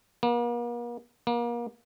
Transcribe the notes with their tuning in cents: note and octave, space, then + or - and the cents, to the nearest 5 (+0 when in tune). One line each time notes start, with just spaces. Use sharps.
A#3 +45
A#3 +35